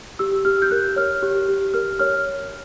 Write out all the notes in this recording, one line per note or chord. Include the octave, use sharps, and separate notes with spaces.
G4 E6
G4 F6
G6
A#4 F#6
C#5 F6
G4
G4
A#4 F6
C#5 F6